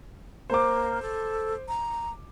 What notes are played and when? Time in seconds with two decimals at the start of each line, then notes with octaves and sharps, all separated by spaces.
0.50 A#3 C5 D6
1.02 A4
1.68 A#5